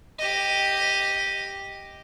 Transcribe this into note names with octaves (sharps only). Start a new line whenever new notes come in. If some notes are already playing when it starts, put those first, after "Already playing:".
G4 D#5